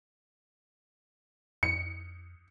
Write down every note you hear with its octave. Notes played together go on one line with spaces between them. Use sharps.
F2 C#7